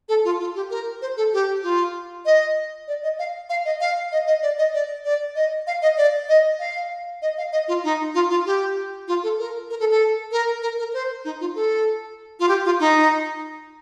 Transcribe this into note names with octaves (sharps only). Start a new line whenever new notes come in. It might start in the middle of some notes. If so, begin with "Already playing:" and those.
A4
F4
F4
G4
A#4
C5
A4
G4
F4
D#5
D5
D#5
F5
F5
D#5
F5
D#5
D#5
D5
D#5
D5
D5
D#5
F5
D#5
D5
D#5
F5
D#5
F5
D#5
F4
D#4
F4
F4
G4
F4
A4
A#4
A#4
A4
A4
A#4
A#4
A#4
C5
D#4
F4
A4
F4
G4
F4
D#4